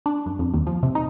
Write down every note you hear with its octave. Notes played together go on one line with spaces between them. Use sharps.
D4
F#2
F2
D#2
F3
C3
D#4